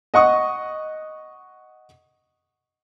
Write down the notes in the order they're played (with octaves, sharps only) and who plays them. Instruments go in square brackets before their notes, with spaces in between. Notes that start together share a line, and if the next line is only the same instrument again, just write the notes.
[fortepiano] D#5 F#5 C#6 D#6